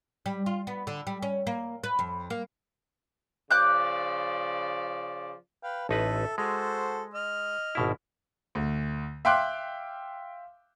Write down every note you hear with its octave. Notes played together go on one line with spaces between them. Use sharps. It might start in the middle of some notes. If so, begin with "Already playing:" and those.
G3
F4
B3
D3
G3
C#4
A#3
B4
F2
A#3
C#3 F3 D5 D6 F#6 G6
B4 F5 G5
A1 D#4 A4 B4 E5
G#3 F#4 A4 C5
D#5 F6
G#1 B2 E4
D2
E5 F5 G5 C6 D6 F#6